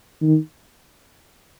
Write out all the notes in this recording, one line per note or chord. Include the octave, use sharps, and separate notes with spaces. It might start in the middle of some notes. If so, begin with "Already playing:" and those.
D#3